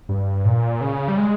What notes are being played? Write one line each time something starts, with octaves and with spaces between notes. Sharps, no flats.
G2
A#2
C#3
G3
G#3